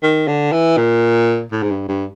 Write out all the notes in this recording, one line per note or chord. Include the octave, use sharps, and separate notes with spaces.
D#3
D3
E3
A#2
A2
G#2
G2
G2